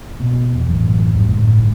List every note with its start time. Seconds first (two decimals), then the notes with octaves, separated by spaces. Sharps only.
0.20 B2
0.54 E1
0.69 A1 F#2
1.14 F2 G#2 G3
1.31 G1 C#2 A2
1.58 G#2